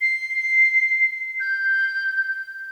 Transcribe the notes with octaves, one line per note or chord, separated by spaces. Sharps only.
C7
G6